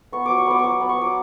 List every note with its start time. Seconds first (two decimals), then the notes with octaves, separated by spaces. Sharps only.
0.12 B3 C#6
0.26 F#3 D6
0.38 C#6
0.47 B3 D6
0.59 F#3 C#6 D6
0.80 B3
0.89 C#6
0.98 F#3 D6